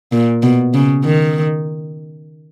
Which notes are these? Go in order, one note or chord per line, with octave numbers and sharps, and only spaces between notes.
A#2
B2
C#3
D#3